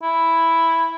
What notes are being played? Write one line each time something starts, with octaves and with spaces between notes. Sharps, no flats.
E4